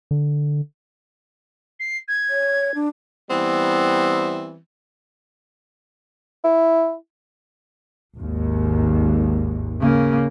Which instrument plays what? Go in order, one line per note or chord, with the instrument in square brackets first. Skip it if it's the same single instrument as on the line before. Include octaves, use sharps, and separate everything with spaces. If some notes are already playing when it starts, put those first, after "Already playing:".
[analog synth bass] D3
[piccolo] C7
G#6
[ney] C#5
D4
[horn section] E3 G3 B3 C4
[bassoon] E4
[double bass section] G#1 D#2
[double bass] C#3 A#3